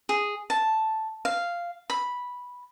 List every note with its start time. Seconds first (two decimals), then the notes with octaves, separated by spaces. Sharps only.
0.09 G#4
0.50 A5
1.25 F5
1.90 B5